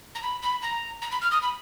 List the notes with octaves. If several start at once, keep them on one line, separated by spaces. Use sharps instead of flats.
A#5
B5
B5
A#5
A#5
B5
F6
D#6
B5